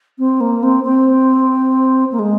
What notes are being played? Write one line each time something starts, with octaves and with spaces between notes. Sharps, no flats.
C4
A#3
C4
C4
A#3
G#3